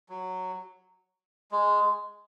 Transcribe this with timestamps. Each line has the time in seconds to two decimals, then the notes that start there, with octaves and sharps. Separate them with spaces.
0.09 F#3
1.52 G#3